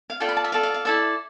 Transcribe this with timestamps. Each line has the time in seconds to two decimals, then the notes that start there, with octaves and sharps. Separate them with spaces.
0.10 F5
0.20 F4 A4 D5 G5
0.29 B5
0.37 A5
0.44 E5
0.52 F4 A4 D5 F5
0.63 F5
0.74 F5
0.85 E4 A4 D5 E5